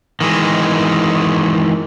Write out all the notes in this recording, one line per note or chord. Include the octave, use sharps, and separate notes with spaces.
D#3 E3 G#3